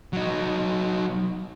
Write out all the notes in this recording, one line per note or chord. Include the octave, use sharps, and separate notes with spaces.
F#3 D#4